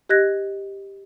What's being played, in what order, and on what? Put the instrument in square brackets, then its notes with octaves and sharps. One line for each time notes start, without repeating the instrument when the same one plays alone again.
[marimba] G4 D#5 F#6 G#6 A#6